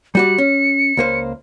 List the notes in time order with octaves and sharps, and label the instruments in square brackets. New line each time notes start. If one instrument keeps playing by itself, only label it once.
[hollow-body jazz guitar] G3 F#4 D5 [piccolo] C#7
[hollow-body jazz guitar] C#4
C#2 A#3 C5